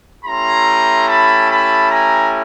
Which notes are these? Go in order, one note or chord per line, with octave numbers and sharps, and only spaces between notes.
A3 C#4 E4 G4 A#5 C6
A5 B5
A5 B5
G#5 A#5